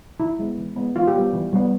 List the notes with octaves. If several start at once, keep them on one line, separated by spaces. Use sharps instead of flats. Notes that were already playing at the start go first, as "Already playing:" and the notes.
E3 E4
G#3 B3
E3
G#3 B3
E3 F4
G4
G3 B3
E3
G3 B3